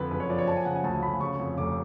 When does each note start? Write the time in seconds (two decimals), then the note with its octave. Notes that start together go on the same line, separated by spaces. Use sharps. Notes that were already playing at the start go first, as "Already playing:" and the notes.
Already playing: F2 D3 B4
0.11 F#1 B4
0.20 C#5
0.29 F3 D5
0.38 C#5
0.47 F3 A5
0.57 G#5
0.65 C#3 F#5
0.75 G#5
0.84 D2 A5
1.02 D2 B5
1.21 C#3 C#6
1.40 F2
1.58 F1 D6